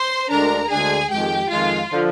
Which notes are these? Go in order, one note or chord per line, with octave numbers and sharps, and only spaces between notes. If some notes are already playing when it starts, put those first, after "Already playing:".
Already playing: C5 C6
D2 D3 G#3 D4 A#4 A#5
D2 D3 G#3 D4 G#4 G#5
F2 D#3 G#3 G4 G5
F2 D#3 G#3 F4 F5
D3 F3